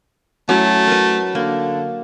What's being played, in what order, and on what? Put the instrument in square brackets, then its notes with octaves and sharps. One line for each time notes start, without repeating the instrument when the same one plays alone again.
[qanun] F#3 C#4 E4 [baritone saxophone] A3
[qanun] A#4 B4
[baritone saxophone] D3 [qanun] A#3